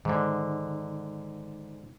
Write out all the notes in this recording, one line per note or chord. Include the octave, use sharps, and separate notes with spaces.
G#2 D3 D#3